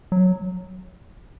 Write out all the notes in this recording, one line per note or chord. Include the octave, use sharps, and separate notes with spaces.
F#3